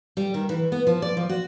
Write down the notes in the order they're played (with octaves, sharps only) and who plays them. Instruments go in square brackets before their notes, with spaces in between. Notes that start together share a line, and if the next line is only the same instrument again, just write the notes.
[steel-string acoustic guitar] G3
D#3
E3
B3
F3
D5
F3
F#4